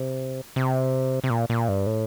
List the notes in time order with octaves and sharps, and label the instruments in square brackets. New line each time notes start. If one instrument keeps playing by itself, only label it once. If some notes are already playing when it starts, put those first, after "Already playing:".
Already playing: [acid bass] C3
C3
C3
A#2
A#2
G2
A2